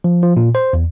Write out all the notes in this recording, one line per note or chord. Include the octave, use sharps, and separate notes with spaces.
F3
F3
A#2
C5
E2